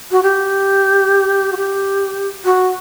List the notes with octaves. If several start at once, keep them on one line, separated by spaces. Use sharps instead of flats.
F#4
G4
F#4
G4
F#4